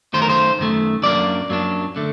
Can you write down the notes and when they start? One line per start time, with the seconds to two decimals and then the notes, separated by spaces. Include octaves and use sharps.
0.13 F#2 D#3 A3 C5
0.22 A#4
0.30 C5
0.59 F#2 D#3 A3
1.03 F#2 F#3 A#3 D4 D5
1.49 F#2 F#3 A#3 D4
1.96 D3 A3